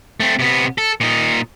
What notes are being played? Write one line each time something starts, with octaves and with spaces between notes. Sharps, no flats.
A3 C4
C3 B3
A4
A#2 D#4